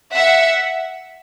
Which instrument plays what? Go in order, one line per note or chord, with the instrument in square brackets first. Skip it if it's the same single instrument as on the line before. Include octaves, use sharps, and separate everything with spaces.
[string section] E5 F#5